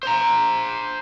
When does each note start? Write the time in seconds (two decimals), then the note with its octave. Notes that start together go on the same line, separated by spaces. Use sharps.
0.03 C5 A#5